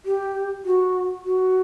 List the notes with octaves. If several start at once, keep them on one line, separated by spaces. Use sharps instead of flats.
G4
F#4
F#4